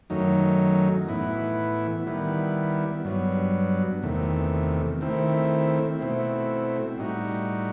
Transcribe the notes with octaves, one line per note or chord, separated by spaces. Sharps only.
F#2 D#3 F#3 A3 D#4
A2 E3 B3 E4
D#3 G3 B3 E4
G2 F#3 B3
E2 C3 D#3 A3
D#3 A3 C4 E4
B2 A3 C4 E4
A2 G3 D#4 F#4